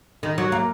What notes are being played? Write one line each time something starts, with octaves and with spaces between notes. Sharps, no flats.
D#3
F#3
A#3